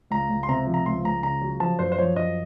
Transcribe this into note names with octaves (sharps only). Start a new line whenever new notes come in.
C#2 A#5
C#2
C6
C3 A#5
F3
A#5
C#2 C6
C#2 A#5
C#3 A#5
F#3
F3 A5
F#2 C5
C5
F3 C#5
F#2 D#5